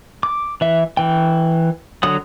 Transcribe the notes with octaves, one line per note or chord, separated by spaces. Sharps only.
D6
E3 E5
E3 G5
D3 F#3 F#5 D#6